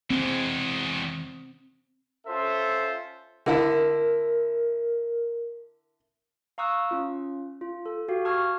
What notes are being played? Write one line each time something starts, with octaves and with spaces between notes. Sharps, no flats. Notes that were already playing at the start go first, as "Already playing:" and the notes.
E2 G#3 C4
C#4 F4 A4 C5 E5
D3 E4 A#4 E5
F5 A#5 C#6 D#6 E6 F#6
C#4 F4
F4
A4
F#4 G4 F5
A5 C#6 D#6 F6 G#6